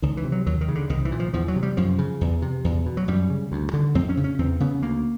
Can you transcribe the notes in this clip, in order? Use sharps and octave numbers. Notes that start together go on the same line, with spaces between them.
C#2 D#3
E3
C3
F#3
D#2 F#3
D#3
C#3
D3
C2 D#3
E3
A#2
F3
E2 F3
F#3
C3
G3
F#2 F3
C#3
E2
C3
E2
B2
F#3
F#2 G3
C#3
D2
D3
F2 C4
C#4
C#3
C#4
E2 C4
C#3 B3
D2 A#3